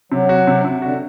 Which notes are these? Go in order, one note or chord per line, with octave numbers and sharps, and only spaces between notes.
C3 F#3
F#4
C3
C3
D3 F#4